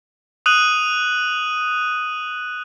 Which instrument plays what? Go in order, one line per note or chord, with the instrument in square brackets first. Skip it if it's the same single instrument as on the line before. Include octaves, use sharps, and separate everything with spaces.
[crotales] D#6 F#6 D#7 F#7